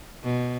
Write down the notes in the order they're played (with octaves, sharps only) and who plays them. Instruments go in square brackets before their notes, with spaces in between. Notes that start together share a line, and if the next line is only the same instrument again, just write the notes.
[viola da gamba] B2